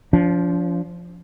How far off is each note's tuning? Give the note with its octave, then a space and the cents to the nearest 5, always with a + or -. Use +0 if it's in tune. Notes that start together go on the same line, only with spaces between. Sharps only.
F3 +0 D4 -40